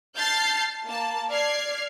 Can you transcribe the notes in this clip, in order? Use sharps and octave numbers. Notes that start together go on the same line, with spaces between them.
A5 F6 G6 A6 C7
A#3 A5
D5 F6 G#6 C7